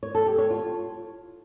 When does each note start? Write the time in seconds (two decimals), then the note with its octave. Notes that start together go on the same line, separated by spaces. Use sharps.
0.03 C#5
0.15 A4
0.26 G4
0.38 C#5
0.50 F4